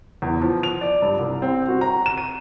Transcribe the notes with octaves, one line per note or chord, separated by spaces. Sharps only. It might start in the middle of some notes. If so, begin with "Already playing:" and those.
E2
F3
F7
D5
G2
C2
C4
F#4
A#5
E7
D#7